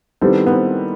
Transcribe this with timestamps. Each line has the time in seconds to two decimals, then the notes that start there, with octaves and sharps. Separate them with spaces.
0.21 D#3 G3 B3 C4 E4 A4
0.46 B3
0.52 C4